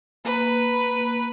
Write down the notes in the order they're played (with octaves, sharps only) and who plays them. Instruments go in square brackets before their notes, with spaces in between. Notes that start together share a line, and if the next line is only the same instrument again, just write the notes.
[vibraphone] A#3 [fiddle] B4